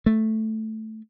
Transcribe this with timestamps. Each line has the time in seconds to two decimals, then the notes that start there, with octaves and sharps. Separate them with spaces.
0.06 A3